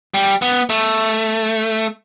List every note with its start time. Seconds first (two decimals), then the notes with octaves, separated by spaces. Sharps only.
0.14 G3
0.42 B3
0.70 A3